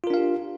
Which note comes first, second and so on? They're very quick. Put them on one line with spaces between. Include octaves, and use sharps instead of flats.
F4 A#4 D4 F5 G4